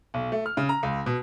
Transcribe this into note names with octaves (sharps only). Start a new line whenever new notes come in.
B1
A3
F6
C#3
A#5
C#2
B2